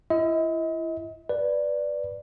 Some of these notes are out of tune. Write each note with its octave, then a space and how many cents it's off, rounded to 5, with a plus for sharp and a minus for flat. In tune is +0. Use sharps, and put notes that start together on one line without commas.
E4 +35 D#5 +40
B4 +0 D5 +0